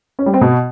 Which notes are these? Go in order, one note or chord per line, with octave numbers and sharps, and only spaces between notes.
C#4
G3
C4
B2